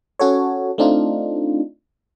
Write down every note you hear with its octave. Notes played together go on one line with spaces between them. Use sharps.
C#4 F#4 A4 C#5
A3 C4 D4 D#4 F4